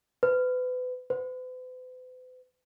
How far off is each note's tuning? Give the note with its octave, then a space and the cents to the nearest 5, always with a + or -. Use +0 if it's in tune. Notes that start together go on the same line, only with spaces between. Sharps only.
B4 +30
B4 +45